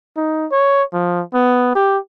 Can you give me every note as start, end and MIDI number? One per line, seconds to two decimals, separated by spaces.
0.17 0.46 63
0.52 0.83 73
0.93 1.22 53
1.34 1.71 59
1.75 1.98 67